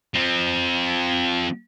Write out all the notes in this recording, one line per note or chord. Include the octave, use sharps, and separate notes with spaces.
F3 C4